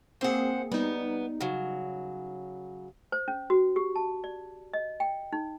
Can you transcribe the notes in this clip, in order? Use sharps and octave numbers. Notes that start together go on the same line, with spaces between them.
A#3 C4 G#4 C5 F#5
G3 B3 D#4
C#3 F#3
C5
C#4
F#4
G4
A5
D5
D#5
G5
D#4